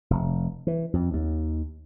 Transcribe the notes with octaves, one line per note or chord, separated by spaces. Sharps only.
F1
E3
F2
D#2